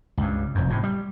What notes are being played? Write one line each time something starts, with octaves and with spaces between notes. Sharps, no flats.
C#2 G2
F1 F#2
A2 C3
G3